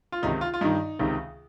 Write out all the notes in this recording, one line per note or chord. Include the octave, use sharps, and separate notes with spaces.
F4
C#2 C3 D#3 D#4
F4
F4
G2 D#3 D#4
C#2 C3 D#3